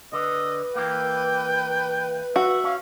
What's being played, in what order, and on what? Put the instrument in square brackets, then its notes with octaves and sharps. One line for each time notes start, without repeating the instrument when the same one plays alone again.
[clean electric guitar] D3 [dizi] B4 [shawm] D#5
[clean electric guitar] E3 A#3 [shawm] G5
[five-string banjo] F#4 [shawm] E5
[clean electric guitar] C#4 [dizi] F5